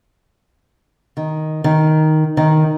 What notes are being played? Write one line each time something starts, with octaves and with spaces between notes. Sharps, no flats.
D#3
D#3
D#3